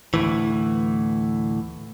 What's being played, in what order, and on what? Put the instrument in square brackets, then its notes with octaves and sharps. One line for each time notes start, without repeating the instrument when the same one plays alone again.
[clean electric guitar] D2 A2 E3